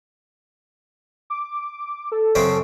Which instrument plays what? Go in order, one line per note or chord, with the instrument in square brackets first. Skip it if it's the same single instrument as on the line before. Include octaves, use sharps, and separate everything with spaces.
[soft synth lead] D6
A4
[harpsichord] F#2 C#3 C4